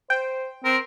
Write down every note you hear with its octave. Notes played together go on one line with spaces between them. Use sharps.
C5 G5
C4 A#4